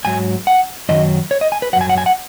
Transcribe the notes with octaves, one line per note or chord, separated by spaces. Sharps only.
G#2 F#3 G#5
F#5
F#2 D#3 F#3 D#5
C#5
D#5
G#5
B4
F#2 F#3 F#5 G#5
F#5
G#5
F#5